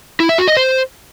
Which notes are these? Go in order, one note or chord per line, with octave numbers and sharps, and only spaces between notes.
E4
E5
F#4
D#5
C5